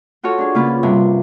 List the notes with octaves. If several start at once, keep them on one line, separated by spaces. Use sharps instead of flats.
F4 F#4 A4 C#5
D4 G#4
C#3 A#3 F4 B4
G2 C3